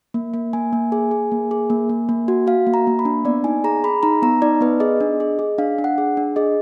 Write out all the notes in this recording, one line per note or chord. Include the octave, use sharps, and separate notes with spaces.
A#3
A#3
A#3 G#5
A#3
G#4 G#5
G#4
A#3
G#4
A#3
A#3
A#3
F#4
F#4 F5
A#3
A#5
A#3
B5
D4
B3 D5
D#4 G#5
G#4 A#5
G#4 B5
D#4 A#5
B3 A#5
D#4 D5
B3 B4
G#4 D#5
D4
G#4
G#4
D4 F5
D4
F#5
G#4
D4
G#4 D#5